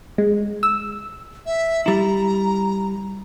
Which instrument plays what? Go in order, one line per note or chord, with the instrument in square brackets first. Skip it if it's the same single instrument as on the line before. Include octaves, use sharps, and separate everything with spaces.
[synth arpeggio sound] G#3
E6
[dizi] E5
[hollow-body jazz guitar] G3 E4 [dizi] A#5